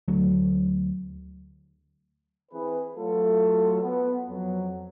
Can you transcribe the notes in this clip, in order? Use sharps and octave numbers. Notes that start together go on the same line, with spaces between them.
D2 F#3 A3
E3 C4 E4 G#4 B4
F#3 A3 F4 A4
B3
F2 F#3